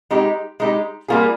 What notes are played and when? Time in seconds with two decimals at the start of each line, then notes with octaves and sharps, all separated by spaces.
0.11 G#3 D#4 G4
0.60 G#3 D#4 G4
1.08 G3 A#3 F4 G#4